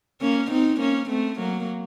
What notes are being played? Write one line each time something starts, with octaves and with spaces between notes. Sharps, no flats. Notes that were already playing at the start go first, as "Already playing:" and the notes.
A#3 C#4
C4 D#4
A#3 C#4
A3 C4
F#3 A#3